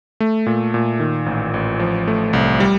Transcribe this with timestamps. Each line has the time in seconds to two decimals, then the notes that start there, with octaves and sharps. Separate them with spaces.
0.20 A3
0.46 A#2
0.74 A#2
1.00 D#3
1.26 A1
1.54 A1
1.80 F3
2.07 A3
2.33 C2
2.60 G3